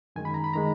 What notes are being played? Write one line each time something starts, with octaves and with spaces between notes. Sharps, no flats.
F#2 D#3 G#3 G#5
B5
A#5
B5
D#3 G#3 A#5